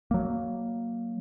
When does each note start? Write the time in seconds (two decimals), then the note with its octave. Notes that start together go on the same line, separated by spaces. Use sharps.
0.11 F#3 A#3